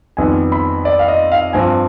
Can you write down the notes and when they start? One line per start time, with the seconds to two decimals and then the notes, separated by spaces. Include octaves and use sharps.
0.17 F2 D#3 G3 B3 G#5
0.52 B5
0.85 D5
0.99 F5
1.08 D#5
1.32 F5
1.53 G2 F3 C4 G#5